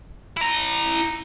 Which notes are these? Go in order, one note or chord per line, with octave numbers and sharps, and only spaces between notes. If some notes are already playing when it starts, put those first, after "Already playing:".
E4 A#5